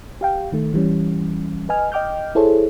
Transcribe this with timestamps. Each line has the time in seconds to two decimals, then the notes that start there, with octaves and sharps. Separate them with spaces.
0.21 G4 F5 G5
0.53 D#3 A3
0.74 E3 G3 C#4
1.69 B4 D#5 G#5 F6
1.92 D#5 G5 D6 F6 G6
2.35 E4 G#4 A4 C5 C#5